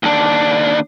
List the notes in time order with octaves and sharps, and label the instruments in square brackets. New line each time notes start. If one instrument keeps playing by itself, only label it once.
[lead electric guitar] D#2 D4